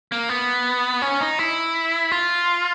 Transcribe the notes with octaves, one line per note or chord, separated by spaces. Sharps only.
A#3
B3
C#4
D#4
E4
F4